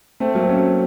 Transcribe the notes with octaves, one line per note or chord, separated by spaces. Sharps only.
A3 C4
F#3 A#3
C4
A#3 C#4